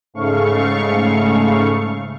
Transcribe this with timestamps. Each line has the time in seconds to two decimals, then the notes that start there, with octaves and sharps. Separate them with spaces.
0.14 G#2 C#3 A3 F5 C#6